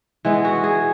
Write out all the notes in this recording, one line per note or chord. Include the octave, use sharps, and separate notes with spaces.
E3 G#3 B3
F#4
G#4